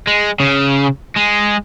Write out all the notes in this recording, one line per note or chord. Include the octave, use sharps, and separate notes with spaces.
G#3
C#3
G#3